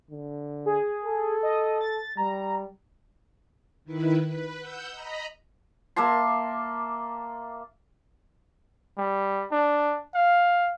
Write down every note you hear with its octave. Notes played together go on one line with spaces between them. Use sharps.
D3
G#4
A4
D#5
A6
G3 A#5
D#3 E4 B4
B4
F#5 E6 G6
D#5 A#5 B5
A#3 E5 A5 C6
G3
D4
F5